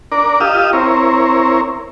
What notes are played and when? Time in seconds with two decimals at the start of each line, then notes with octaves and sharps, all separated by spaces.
0.12 D4 A#4 D5
0.40 F4 G4 D#5 F5 D#6 E6
0.73 C4 E4 A#4 C#5